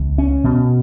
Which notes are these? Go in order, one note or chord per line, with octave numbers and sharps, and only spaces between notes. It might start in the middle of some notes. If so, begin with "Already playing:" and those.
Already playing: C#2
C#4
B2